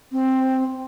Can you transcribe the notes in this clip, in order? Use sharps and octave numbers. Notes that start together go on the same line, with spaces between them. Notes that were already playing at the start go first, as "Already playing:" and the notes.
C4